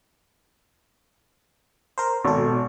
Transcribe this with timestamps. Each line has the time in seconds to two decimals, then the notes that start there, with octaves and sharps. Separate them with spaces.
1.98 A#4 C5
2.25 G#1 B2 A4